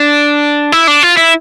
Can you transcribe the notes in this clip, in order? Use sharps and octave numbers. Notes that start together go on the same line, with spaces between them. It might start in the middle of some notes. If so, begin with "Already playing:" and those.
Already playing: D4
E4
D4
F4
E4